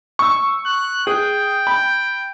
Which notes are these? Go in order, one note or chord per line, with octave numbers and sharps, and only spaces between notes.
C#6 E6
F#6
G#4 G5
B5